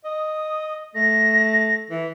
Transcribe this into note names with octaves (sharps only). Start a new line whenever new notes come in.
D#5 D#6
A3 A#6
E3